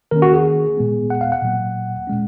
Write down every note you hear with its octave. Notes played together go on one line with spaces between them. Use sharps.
D#3 A#3 C#4 A#4
F#4
G#4
A#2 G#3 B3
F#5
F5
F#5
A#2 F#3 A#3
A#2 G#3 C#4